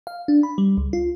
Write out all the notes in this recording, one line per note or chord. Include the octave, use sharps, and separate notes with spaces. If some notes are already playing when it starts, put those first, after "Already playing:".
F5
D4
B5
G3
C#2
F4